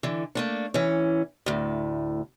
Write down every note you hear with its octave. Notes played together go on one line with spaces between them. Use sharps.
D3 E3
A3 A#3 D4
E3 C#4
D2 A2